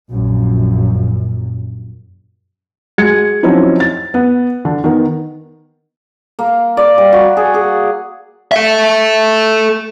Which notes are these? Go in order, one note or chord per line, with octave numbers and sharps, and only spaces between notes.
A#1 F#2
G#3 F#4 G#6 C#7
F3 F#3 C4 C#4 D#4 E4
A6
B3
D3
D#3 B3 A#4
A#3
D5
G3
F#4
G#4
G#4
A4 E5